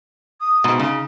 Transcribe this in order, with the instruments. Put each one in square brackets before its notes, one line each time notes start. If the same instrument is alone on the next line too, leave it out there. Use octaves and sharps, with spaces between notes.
[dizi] D#6
[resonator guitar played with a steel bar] G#2 B2
[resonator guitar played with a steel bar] C#3 [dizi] D#4